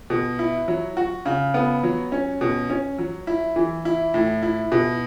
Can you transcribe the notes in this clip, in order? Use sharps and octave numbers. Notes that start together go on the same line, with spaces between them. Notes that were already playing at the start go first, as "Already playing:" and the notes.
B2
E4
F#3
F#4
C#3
B3
F#3
C#4
B2
C#4
F#3
E4
E3
E4
A2
E4
B2